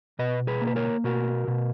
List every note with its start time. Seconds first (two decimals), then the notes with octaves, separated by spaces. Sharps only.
0.19 B2 B4 D#5
0.47 G#4 B4
0.61 A#3
0.67 B4
0.76 A#4 C#5
1.04 B2 F#4 A#4
1.47 B2